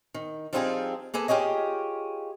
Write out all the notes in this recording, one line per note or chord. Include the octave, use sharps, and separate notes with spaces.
D#3
F3 G3 C4 D#4 F4 G#4
A#3 G#4 A4 B4
F4 G4 G#4 C#5 D#5